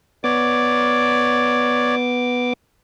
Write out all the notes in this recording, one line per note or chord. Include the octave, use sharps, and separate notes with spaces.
B3 C#5 D5 D6